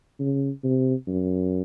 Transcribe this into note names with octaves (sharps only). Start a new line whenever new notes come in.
C#3
C3
F#2